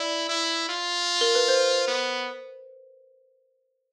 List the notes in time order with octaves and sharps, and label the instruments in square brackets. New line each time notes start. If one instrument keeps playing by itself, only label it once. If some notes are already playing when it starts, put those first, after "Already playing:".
Already playing: [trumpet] E4 [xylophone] D5
[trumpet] E4
F4
[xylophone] A#4
B4
C5
[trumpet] B3